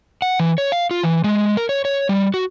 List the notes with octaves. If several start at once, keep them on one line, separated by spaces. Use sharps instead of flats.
F#5
E3
C#5
F5
F4
E3
G#3
A#4
C#5
C#5
G3
F#4